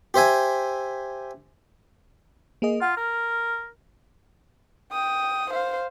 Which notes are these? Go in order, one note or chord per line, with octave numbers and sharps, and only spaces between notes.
G4 C5 E5 G#5
A#3 G#4 D#5
F4 F#5
A#4 F6
G5 D#6
C5 F5